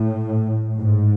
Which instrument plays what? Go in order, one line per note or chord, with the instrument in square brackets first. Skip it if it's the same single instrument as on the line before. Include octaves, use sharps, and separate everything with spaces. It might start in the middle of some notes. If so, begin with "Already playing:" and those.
Already playing: [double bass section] A2
G#2